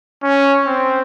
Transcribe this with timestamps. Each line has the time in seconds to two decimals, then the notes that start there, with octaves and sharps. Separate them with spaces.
0.23 C#4
0.66 C4